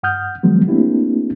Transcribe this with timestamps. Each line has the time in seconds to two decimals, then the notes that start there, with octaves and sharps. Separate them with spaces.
0.03 G2 F#5 D#6 F6 G6
0.43 D#3 F3 F#3 G#3 B3
0.68 A3 A#3 C4 D4 E4 G4